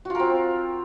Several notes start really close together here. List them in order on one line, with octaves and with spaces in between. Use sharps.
F#4 F4 A#4 C4